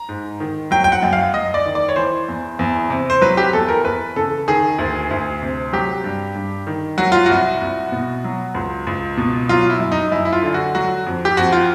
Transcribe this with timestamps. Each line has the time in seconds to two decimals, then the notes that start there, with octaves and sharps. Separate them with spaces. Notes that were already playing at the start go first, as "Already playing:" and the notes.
Already playing: A#5
0.09 G#2
0.40 D#3
0.71 F#3 G5
0.84 G5
0.92 F#5
1.02 F#2
1.13 F5
1.34 F#2 D#5
1.54 D5
1.65 D#3
1.75 D5
1.89 C#5
1.96 E3 C5
2.29 E2
2.59 E2
2.90 C3
3.10 C5
3.21 F#3 B4
3.37 G4
3.53 E2 A4
3.68 A#4
3.85 E2 B4
4.16 C#3 A4
4.48 D#3 G#4
4.78 D2
5.11 D2
5.42 C3
5.73 F#3 G4
6.04 G2
6.36 G2
6.67 D#3
6.98 F#3 F#4
7.12 F4
7.26 C2 F#4
7.61 C2
7.92 B2
8.24 F#3
8.55 C#2
8.87 C#2
9.17 B2
9.49 F#3 F4
9.70 E4
9.80 F#2
9.92 D#4
10.12 F#2 E4
10.25 E4
10.33 F4
10.43 D3
10.54 F#4
10.75 F#3 F#4
11.06 F2
11.25 G4
11.37 F2 F#4
11.52 F4